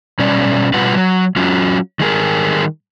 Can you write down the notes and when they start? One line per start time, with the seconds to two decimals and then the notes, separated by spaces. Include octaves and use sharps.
0.19 B2 G3 C#4 D5
0.74 B2 G3 F4 B4 F#5
0.95 F#3
1.36 F#3 C#4 F4 F#4
2.00 D#3 G3 G#4 A#4